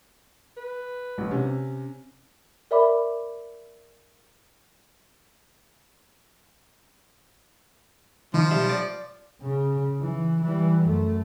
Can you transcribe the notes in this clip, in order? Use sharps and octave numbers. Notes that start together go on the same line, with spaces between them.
B4
A1
C3 C#4
A#4 D5 E5 B5 D6
D#3 F3
B1 G3 E5
D5
C#3
E3
E3 G3
F#2 A3